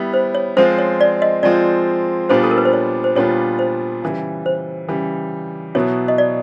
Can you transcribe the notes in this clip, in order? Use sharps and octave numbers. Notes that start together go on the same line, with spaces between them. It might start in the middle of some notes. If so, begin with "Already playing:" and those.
Already playing: G3 B3 E4
C5
C#5
F3 G#3 C4 F4 C5
C#5
D5
D#5
F3 G#3 C4 F4 D5
A#2 G3 B3 D4 F4 C5
A4
A#4
B4
C5
C#5
C5
A#2 G3 B3 D4 F4 C#5
C5
C#3 E3 G3
C5
C#3 E3 G3
B2 F#3 B3 E4 C#5
D#5
D5